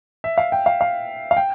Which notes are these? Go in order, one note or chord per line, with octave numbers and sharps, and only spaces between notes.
E5
F5
G5
F5
F5
F5
G5